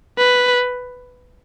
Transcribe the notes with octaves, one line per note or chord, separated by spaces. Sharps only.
B4